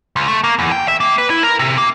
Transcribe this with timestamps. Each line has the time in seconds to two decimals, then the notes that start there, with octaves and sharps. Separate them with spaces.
0.16 C#2
0.28 A3
0.44 A#3
0.59 E2
0.72 G5
0.88 E5
1.00 A#3
1.18 B4
1.30 E4
1.43 A#4
1.59 C3
1.78 A#3